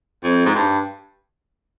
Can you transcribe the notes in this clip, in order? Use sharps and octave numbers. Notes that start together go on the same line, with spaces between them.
F2
G#2
G2